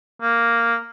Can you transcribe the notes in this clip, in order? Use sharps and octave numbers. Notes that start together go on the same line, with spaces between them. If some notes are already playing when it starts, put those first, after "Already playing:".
A#3